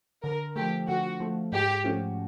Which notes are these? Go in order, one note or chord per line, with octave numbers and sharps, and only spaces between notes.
D3 A#4
F3 A3 G4
D3 F#4
F3 A3
G#2 G4
F3 A3 C#4 F#4